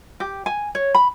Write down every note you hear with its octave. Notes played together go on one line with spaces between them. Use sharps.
G4
G#5
C#5
B5